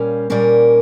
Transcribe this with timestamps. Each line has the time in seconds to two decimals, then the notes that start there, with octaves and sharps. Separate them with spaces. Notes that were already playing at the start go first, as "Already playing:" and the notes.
Already playing: A#2 G3 A#3 C#4
0.30 A#2 G3 A#3 C#4 A#4